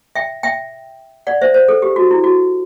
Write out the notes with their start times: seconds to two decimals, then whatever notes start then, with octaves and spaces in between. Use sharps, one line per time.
0.15 E5 G5
0.43 E5 G5
1.27 D5 F#5
1.42 C5 E5
1.54 C5
1.68 A4
1.82 G4
1.96 F#4
2.11 E4
2.24 F#4